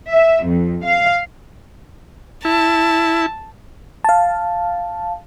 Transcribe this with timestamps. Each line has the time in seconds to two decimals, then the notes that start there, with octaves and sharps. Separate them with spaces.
0.11 E5
0.46 F2
0.83 F5
2.45 E4 A5
4.04 F5 A5